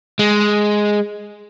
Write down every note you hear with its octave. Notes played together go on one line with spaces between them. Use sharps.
G#3